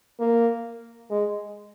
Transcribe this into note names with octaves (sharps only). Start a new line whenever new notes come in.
A#3
G#3